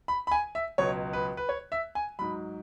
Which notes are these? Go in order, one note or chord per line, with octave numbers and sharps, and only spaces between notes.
B5
B5
G#5
E5
C#2 B2 F#3 C#5
B4
B4
C#5
E5
G#5
G#2 F#3 B5